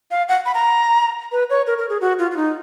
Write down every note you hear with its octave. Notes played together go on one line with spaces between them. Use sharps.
F5
F#5
B5
A#5
B4
C#5
A#4
A#4
G#4
F#4
F4
F4
D#4